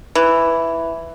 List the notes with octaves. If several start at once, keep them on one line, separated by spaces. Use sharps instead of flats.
E3